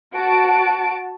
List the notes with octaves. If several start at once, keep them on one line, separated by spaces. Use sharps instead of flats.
F#4 A5 D7